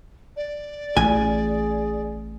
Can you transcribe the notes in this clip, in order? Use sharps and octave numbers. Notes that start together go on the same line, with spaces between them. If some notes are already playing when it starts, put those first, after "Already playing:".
D5
A1 G#4 G#5